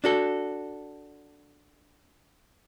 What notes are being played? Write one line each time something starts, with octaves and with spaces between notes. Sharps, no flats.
D4 F#4 A4